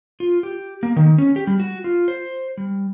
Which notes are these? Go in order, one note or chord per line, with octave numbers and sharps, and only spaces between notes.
F4
G4
A#3
D#3
C#4
G4
G3
F#4
F4
C5
G3